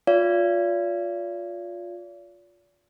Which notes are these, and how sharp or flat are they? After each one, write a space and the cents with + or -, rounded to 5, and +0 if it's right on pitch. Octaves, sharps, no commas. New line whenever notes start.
F4 +20 D5 -40 F5 -45